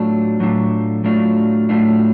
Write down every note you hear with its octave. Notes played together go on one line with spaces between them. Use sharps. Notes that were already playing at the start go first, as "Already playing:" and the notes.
Already playing: A2 F#3 A3 D4 F4
A2 F#3 A3 D4 F4
A2 F#3 A3 D4 F4
A2 F#3 A3 D4 F4